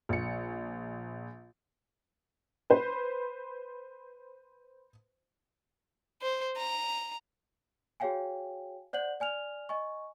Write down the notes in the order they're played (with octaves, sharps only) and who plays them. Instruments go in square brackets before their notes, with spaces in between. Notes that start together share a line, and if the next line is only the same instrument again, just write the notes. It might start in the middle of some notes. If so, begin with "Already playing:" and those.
[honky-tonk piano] A#1 C#7
B4 C5
[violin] C5
A#5
[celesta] F#4 G#4 C#5 F5 G5 G#5
C5 D5 F#5 G6 F#7
D5 G#5 F6 F7
D#5 G#5 C#6